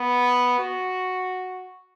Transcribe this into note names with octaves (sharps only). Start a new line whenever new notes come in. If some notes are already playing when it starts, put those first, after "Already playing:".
Already playing: B3
F#4